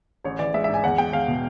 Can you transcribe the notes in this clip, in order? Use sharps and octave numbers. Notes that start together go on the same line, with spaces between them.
A1 C#5
E3 D5
G#3 E5
E5
G#2
G#5
E2 F#5
G#3 G5
E2 F5
B2